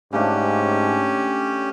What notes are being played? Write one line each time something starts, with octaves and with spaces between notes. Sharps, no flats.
G#2 C#3 A3 C#4 D4 G4